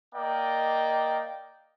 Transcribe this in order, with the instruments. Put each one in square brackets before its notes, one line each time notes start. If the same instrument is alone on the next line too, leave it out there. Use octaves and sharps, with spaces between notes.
[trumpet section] A#3 D5 D#5 G5